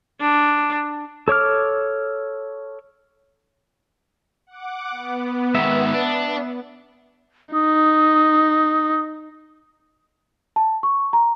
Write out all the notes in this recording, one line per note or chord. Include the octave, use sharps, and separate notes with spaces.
D4
A4 C#5 D6 F6
F#5 D6
B3
G#2 D#3 E5
D4
D#4 D#6
A5
C#6
A#5